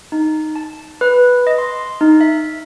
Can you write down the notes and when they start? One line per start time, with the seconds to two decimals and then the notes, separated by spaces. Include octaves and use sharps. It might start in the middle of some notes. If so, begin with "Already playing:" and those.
0.12 D#4
0.56 A5
1.01 B4
1.47 D#5
1.58 C6
2.01 D#4
2.21 E5